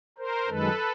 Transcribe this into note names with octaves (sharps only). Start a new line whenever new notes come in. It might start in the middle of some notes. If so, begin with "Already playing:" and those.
A#4 C5
F#2 D#3 G#3 A4 B4